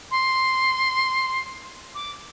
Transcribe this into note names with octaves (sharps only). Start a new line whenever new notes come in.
C6
D6